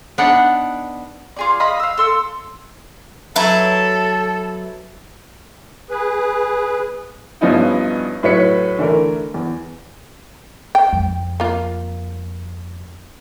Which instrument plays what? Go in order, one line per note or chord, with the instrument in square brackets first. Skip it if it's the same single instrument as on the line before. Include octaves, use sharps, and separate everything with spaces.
[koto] B3 D4 D#4 D5 F#5
[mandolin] F4 G#4 D5
D#5 F5 B5 D#6
F5 E6
A4 C6 E6
[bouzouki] F#3 E4 B4 [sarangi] A4
[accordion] G#4 B4
[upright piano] G2 F3 B3 C#4 D#4 E4
A2 F#3 B4 C#5 B6 C#7
D3 E3 A3 A#4
E2
[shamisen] G5
[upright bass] F2
[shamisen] A#3 F4